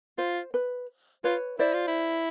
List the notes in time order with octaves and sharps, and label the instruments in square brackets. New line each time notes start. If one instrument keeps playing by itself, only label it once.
[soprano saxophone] F4 [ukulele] C5
[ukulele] B4
[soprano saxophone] F4 [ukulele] B4 C#5
[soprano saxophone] E4 [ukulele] C5 D5
[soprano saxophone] F4
E4